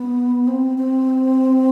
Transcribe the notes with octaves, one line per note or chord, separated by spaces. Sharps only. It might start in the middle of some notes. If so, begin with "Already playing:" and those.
Already playing: B3
C4
C4